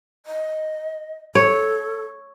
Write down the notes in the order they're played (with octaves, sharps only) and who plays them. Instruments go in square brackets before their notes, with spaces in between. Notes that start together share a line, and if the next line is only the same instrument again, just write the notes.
[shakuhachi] D#5
[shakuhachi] A4 [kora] C#5